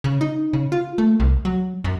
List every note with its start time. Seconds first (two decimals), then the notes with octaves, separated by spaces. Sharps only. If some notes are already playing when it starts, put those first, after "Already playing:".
0.04 C#3
0.21 D#4
0.53 C#3
0.72 F4
0.98 A3
1.20 C2
1.45 F#3
1.84 F#2